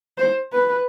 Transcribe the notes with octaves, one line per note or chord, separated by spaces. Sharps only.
C5
B4